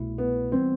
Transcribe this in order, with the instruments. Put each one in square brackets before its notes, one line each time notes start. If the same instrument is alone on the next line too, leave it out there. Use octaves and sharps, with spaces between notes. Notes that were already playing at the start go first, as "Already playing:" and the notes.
Already playing: [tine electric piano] C2 B2 A3 E4
[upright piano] B3
[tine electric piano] E3 G3 B3 [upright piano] C4